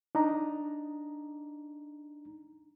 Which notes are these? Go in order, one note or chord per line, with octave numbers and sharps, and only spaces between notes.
D4 D#4 A#5